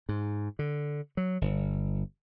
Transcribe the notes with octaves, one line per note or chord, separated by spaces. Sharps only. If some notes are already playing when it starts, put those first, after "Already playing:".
G#2
D3
F#3
G1